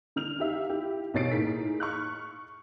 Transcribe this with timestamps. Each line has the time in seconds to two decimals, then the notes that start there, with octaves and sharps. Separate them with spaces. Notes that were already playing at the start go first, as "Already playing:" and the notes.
0.16 D3 F6 F7
0.39 D#4 G4 E5 F5
0.69 E4 G4
1.14 B1 B2 C#5 A6 C7 D7
1.31 A2 A#3 D#4 G#4 B6
1.80 C#6 F6 F#6